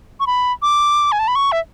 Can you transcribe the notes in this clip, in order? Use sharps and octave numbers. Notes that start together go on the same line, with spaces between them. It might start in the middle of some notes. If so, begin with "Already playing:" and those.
C#6
B5
D6
G#5
A5
B5
C#6
E5